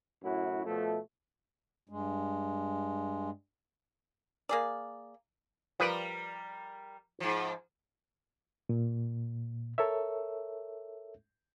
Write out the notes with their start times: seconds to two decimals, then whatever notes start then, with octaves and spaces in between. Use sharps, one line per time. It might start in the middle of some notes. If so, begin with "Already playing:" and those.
0.23 F#2 A2 E4 F#4
0.66 B2 F3 A3
1.89 G2 G#3
4.49 A#3 G#4 D5
5.80 F3 G3 A#4 B4 D5
7.20 G#2 F3
8.69 A#2
9.78 A4 A#4 C#5 E5